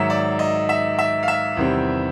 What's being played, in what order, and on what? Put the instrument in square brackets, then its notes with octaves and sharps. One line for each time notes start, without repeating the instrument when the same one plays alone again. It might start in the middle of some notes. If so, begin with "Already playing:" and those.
Already playing: [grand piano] G#2 D#3 F#3 E5
D5
D#5
E5
E5
F5
E5
E2 C3 D#3 G3 C4